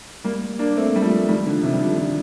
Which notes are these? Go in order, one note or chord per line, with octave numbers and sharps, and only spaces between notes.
G3 A#3
A#3 D4
A3 C4
G3
F3 A3
D#3 G3
D3 F3
C3 D#3
G3
D3 F3
D3 F3